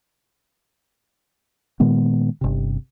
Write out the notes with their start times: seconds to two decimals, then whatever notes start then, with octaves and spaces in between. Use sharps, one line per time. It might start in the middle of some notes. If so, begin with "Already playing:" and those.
1.80 A#2 D#3 G#3 B3
2.41 G1 C3